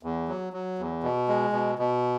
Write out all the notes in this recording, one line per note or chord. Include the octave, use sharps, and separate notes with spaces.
E2
F#3
F#3
E2
B2
G#3
B2
B2